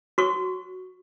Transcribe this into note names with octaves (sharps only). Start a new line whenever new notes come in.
F#4 C#6